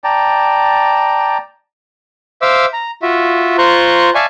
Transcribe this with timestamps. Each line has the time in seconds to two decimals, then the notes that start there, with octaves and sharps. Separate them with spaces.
0.04 D5 G5 A5 A#5
2.42 C5 E5 F5 D6 E6
2.73 A#5
3.02 F4 F#4 E5
3.58 F4 C5 A#5 C6 C#6 F#6
4.15 D5 E5 F5 G#5 A5 C#6